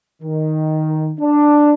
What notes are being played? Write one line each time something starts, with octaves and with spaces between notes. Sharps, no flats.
D#3
D4